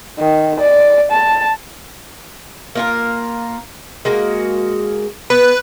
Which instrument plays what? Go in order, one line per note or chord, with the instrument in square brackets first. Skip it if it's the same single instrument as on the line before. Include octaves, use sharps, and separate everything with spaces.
[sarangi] D#3
D5
A5
[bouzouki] A#3 F4 A#4
G#3 A#3 F#4
[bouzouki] B3 [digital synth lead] B4